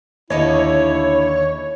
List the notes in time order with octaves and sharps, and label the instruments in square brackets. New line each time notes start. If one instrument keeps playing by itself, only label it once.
[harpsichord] D#2 [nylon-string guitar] D3 D#5 [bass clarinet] E4 [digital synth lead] C#5